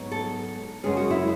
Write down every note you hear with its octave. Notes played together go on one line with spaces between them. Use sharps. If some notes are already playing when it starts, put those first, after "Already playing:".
Already playing: G#2 F#3 B3 D4
A4
F#2 C#3 G#3 C#4 G#4
F#4
E4